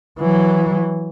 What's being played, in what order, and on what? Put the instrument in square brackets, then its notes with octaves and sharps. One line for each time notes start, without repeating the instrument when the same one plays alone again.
[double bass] E3 F#3